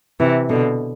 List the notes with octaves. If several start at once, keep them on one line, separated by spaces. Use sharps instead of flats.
C3 E3
B2 D3